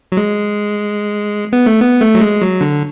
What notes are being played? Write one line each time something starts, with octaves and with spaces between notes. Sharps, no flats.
F#3
G#3
B3
A3
B3
A3
F#3
G#3
F#3
D3